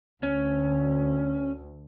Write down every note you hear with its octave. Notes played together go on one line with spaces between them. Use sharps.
D2 C#4